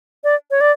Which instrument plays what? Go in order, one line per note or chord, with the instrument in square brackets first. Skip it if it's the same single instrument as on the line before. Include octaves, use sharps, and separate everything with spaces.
[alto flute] D5
C#5
D5